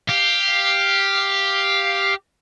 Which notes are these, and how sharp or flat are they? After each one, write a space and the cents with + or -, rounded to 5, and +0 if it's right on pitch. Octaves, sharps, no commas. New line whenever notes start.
G4 +5 F5 +0